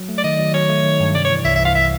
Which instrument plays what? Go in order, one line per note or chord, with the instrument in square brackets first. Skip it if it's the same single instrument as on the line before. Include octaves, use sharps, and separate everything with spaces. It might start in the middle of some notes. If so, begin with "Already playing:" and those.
Already playing: [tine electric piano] F#3
A3
[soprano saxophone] D5
[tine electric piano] D#3 [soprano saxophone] D#5
[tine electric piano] F#3
[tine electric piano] F#3 [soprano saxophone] C#5
[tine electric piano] A3
D#3
G2
[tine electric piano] C3 [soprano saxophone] D5
[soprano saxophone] C#5
[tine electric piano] E3
[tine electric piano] C2 [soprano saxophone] E5
[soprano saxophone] E5
[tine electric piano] E3
[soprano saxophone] F5
E5